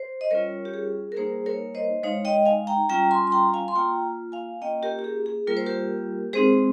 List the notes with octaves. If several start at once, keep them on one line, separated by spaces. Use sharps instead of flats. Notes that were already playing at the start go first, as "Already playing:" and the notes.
Already playing: C5
D#5
G3 C#4 F4 A#4 C#5
G4
G#4
A#4
G3 A#3 D#4 G#4 C5
A#4 C#5
C5 D#5
G#3 D#4 C#5 F5
D#5 G5
F5 G#5
G5 A#5
G3 C#4 F4 G5 A#5
G#5 C6
C6
G5 A#5
F5 G#5
C6
A#3 F4 G5 A#5
F5 G#5
A#3 C#4 F4 D#5 G5
G4 A#4
G4
G#4
G#4
G3 A#3 F4 A#4
C5
G4 A#4
G#3 C4 D#4 G#4 C5